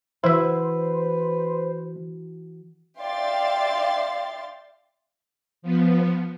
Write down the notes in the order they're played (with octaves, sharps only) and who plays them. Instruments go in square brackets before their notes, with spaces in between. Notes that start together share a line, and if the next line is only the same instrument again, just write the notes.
[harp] E3 F#4 [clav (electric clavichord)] E4 E5 [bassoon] B4 [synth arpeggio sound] C5
[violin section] D5 E5 F5 G5 C6 A6
[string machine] F3 B3